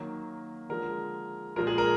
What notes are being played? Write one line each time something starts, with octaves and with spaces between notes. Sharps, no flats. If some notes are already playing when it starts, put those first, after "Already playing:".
Already playing: D#3 F#3 A#3
D3 F3 G#3 A#4
A#2 F3 G#3 A#4
G#4
A#4